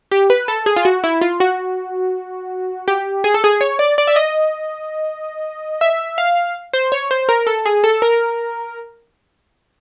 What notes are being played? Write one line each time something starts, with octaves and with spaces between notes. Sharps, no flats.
G4
B4
A4
G#4
F4
F#4
E4
F4
F#4
G4
G#4
A4
G#4
C#5
D5
D5
E5
D#5
E5
F5
C5
C#5
C5
A#4
A4
G#4
A4
A#4